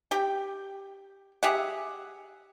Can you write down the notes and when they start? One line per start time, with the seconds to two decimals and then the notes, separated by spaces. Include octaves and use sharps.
0.11 G4 G5
1.43 G4 G#4 E5 F#5